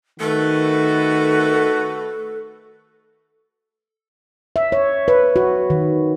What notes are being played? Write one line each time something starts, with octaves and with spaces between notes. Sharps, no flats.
D#3 A3 F#4 A4 B4
E5
C#5
B4
F#4
D#3